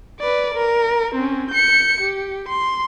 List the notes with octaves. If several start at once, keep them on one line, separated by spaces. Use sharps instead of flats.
B4 D5
A#4
C4 C#4
G6 C#7
G4
C6